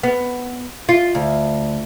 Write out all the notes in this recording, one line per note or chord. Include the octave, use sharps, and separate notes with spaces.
B3
F4
D2